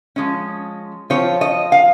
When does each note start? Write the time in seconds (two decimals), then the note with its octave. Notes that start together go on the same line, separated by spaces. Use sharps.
0.16 F3 G#3 C#4
1.10 F3 C4 F4 C#5
1.41 D#5
1.72 F5